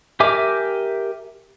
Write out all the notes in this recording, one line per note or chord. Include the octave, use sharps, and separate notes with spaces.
G4 A#4 E5 G#5 D6